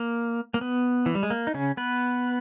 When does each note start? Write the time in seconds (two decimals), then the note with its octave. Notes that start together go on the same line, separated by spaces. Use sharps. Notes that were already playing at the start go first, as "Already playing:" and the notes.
Already playing: A#3
0.54 A#3
0.61 B3
1.06 E3
1.15 G3
1.23 G#3
1.30 A#3
1.47 D#4
1.54 C#3 C#4
1.77 B3 B4